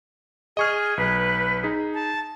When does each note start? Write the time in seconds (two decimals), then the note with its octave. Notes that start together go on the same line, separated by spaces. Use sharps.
0.57 G#4 D#5 C#6 F6
0.97 B1 B4
1.63 D#4 G#4
1.94 A5